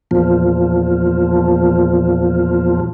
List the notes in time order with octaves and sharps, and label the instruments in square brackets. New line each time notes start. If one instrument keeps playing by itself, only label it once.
[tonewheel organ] E2 A#2 F3